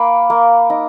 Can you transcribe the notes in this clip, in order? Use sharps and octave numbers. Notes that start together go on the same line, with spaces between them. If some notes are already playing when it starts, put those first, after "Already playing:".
Already playing: A#3 F5 B5 D6
A#3
D#4